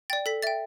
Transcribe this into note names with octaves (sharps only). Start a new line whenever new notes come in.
D5 G5 A6
A4 B6
E5 G5 A6